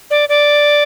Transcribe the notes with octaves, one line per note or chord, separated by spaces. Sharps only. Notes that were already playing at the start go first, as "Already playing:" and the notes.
D5
D5